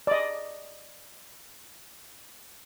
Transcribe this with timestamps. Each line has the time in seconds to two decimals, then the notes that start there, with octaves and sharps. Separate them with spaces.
0.07 D5 D#5